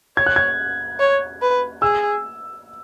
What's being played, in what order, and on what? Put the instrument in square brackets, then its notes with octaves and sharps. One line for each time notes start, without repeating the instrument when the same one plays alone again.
[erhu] C#5 [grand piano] G#6
[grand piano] F#6
G#6
[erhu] C#5
B4
[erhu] G#4 [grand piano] E6